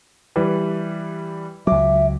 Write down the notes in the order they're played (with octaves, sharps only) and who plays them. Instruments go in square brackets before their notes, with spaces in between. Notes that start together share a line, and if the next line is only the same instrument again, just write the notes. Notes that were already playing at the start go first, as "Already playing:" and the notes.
[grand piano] E3 G3 B4
[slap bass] C#2 F#3 [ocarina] E5 [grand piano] D6